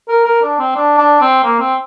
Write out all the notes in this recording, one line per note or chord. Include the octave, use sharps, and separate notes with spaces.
A#4
A#4
D4
C4
D4
D4
C4
A#3
C4